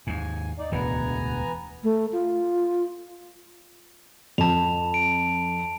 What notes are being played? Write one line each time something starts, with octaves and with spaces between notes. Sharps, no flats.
D#2 G#2 G#5
D#4 D5
E1 D2 A2 B3 G#5 A#5
A3
F4
F2 A5 F7
D7